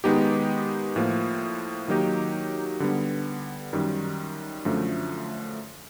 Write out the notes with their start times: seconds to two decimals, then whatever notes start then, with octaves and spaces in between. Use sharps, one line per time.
0.04 D#3 G#3 B3 D#4 G4
0.96 A2 F3 A#3
1.88 D#3 F#3 A#3 D#4 G4
2.80 D3 G3 B3
3.73 F#2 D#3 G3
4.65 F#2 D3 F3 A3